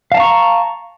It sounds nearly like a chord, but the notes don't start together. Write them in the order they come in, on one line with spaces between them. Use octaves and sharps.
F5 A5 A#5 C#6